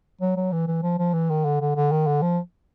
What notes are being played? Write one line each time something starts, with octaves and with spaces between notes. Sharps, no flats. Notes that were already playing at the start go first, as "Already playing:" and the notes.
F#3
F#3
E3
E3
F3
F3
E3
D#3
D3
D3
D3
D#3
D3
F3